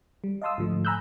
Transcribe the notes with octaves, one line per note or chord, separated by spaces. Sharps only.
G3
D#5 F5 A5 C6 D#6 E6
G#2 D3 F3 A3
G#5 A#5 B5 E6 F#6 G6